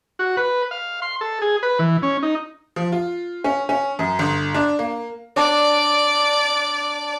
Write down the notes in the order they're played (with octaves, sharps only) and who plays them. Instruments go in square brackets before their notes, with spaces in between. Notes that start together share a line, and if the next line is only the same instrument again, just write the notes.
[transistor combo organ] F#4
B4
F5
C6
A4
G#4
B4
E3
C#4
D#4
[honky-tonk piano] F3
F4
C#4
C#4
F#2
G1
D4
A#3
[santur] D4 [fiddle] D5